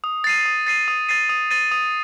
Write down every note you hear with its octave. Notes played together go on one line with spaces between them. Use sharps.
D#6
A6 C7 D#7
D#6
A6 C7 D#7
D#6
A6 C7 D#7
D#6
A6 C7 D#7
D#6